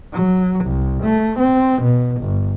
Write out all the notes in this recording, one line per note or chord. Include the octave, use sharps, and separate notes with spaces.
F#3
C2
A3
C4
B2
G1